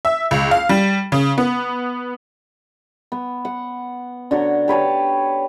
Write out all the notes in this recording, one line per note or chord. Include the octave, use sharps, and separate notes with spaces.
E5
C#2
F5
G3
C#3
B3
B3
F#5
D3 F#4 C#5 A#5
G4 B4 C#5 A5